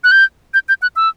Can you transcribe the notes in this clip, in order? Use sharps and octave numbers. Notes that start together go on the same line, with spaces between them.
F#6
G6
G6
G6
F#6
E6